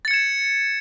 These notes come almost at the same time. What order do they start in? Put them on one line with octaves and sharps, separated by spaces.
A6 C#7 G#6 E7